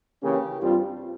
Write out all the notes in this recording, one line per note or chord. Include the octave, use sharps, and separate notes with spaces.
C#3 E3 A#3 C#4 G4
G2 G3 C4 F4